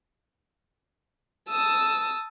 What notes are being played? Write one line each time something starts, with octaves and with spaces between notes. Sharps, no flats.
A5 D#6 E6